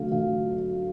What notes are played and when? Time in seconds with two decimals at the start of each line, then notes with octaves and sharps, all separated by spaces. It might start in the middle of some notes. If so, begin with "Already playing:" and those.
Already playing: D3 F#3 A3 F5
0.12 D3 F5